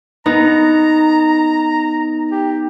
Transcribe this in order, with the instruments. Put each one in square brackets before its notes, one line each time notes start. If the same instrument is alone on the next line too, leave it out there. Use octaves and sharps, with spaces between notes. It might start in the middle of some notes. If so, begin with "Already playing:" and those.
[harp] B3 D#4 [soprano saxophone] A#5
[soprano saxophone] G4